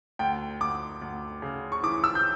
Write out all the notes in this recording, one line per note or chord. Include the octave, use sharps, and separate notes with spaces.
D2 G5
D2 D6
D2
C#3
C#6
E3 D6
E6
G6